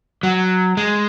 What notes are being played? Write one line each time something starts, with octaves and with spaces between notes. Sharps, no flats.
F#3
G#3